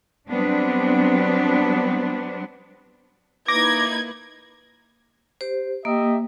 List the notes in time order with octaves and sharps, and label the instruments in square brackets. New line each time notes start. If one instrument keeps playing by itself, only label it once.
[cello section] F#3 G3 B3 C4 D4
[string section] A#3 E4 B4 [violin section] D#4 G#6 [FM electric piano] D6 A#6
[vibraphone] G4 C5
[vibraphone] A#3 [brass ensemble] G4 D#5 E5